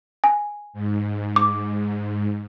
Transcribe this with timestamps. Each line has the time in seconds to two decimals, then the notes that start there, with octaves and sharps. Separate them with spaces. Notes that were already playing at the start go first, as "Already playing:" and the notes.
0.24 G#5
0.73 G#2
1.36 D6